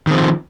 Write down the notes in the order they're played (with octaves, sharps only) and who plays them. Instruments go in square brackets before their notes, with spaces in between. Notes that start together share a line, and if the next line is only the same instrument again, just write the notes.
[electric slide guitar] D#3
C4
F3